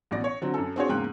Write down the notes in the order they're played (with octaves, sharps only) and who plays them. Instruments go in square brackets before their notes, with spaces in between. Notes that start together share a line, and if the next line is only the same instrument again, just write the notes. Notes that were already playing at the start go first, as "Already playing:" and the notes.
[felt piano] A1 B2 D5 A#6
C#5
D3 F#3 C4
F#2 A4
C4 D4 F#4 G#4 C5 C#5
E2 G#2 C#3 A#3 G5 F#6